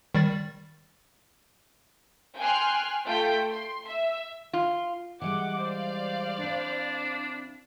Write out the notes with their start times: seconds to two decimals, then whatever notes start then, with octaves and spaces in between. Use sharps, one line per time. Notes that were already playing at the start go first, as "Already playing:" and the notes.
0.15 D#3 G3 A6
2.38 G5 G#5 C6 F6 F#6
3.05 A3 F4 G5 G6 B6
3.50 C6
3.87 E5
4.53 F4
5.22 E3 G3 G#3 F#5 D6
5.63 C5 D5 F5
6.39 C4 D4 E4